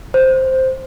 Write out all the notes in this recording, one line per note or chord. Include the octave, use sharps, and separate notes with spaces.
C5